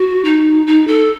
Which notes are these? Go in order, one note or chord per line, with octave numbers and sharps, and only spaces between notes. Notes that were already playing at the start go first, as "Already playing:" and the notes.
Already playing: F#4
D#4
D#4
A4